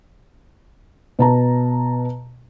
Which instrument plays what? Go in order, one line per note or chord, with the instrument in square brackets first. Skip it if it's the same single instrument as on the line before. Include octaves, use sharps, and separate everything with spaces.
[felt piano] B2 A5 A#5